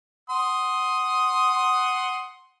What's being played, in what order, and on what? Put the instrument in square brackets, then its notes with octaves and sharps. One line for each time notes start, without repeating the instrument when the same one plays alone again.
[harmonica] F#5 C6 D#6